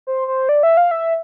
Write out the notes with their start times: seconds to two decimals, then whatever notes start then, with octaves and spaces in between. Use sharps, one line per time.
0.07 C5
0.28 C5
0.49 D5
0.63 E5
0.77 F5
0.91 E5